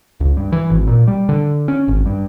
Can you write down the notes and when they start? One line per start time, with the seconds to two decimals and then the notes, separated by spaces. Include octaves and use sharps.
0.20 C#2
0.37 G2
0.52 E3
0.70 G#1
0.87 A#2
1.08 G3
1.29 D3
1.68 C#4
1.88 G#1
2.06 G2